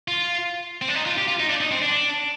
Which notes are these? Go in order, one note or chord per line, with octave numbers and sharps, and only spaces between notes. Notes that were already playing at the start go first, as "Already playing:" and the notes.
F4
C4
D4
D#4
F4
G4
F4
D#4
D4
D#4
C4
D4